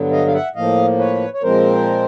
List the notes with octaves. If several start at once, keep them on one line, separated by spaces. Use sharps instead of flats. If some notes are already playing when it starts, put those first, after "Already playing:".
Already playing: G2 D3 F#3 B3
D#5 F5
F5
E5 F#5
A2 F3 A#3 D#5 F5
B4 C#5
C#5
A#2 F3 G#3 C4 A#4 C5